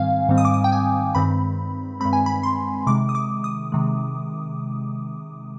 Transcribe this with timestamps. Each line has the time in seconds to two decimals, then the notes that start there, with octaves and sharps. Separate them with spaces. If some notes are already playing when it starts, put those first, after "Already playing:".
Already playing: G#2 D#3 G3 C4 F5 G#5
0.29 G#2 D#3 G3 C4
0.38 D#6
0.45 D6
0.54 D#6
0.64 G5
0.72 G#5
1.15 G2 D#3 G#3 C4 B5
2.00 G2 D#3 G#3 C4 B5
2.13 G#5
2.26 B5
2.43 C6
2.87 C3 D#3 G#3 D6
3.09 D#6
3.15 D6
3.44 D#6
3.72 C3 D#3 G#3